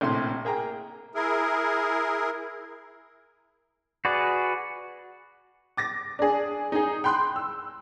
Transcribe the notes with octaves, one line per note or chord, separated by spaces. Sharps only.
A#1 A2 C3 E4 C6
A#3 G#4 G5 A#5
E4 G#4 A#4
F#4 G#4 B4 D5
D6 A6 A#6
D4 G#4
D#4 G#4
G5 B5 C6 F#6
E6